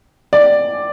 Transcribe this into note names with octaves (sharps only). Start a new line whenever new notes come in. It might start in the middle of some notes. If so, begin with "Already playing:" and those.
D5